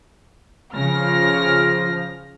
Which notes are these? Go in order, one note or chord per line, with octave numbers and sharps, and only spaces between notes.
C#3 F3 F6 A#6